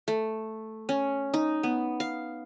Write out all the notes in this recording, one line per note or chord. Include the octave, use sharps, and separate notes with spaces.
A3
C#4
D#4
B3
F5